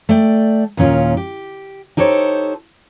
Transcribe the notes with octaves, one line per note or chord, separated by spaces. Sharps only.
A3 D5 G5
D#2 A#2 C#4 F4
G4
D#4 G4 A4 C5 C#5